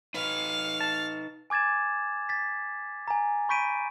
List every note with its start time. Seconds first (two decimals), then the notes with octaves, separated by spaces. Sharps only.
0.14 D#4 B4 F5
0.81 A5
1.50 G#5 D6 G#6 A6 E7
2.29 A6 B6
3.08 G#5 A#5
3.49 B5 C#6 G6 B6 D7 D#7